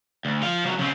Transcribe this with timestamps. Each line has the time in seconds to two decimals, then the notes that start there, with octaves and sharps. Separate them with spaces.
0.25 D2
0.42 F3 F5
0.64 C#2 F#3
0.79 C#3 C4